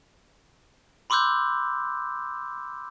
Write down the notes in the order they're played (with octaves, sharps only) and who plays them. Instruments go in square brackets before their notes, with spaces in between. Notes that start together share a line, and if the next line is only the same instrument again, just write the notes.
[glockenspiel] B5 C6 D6 E6 F#6 G6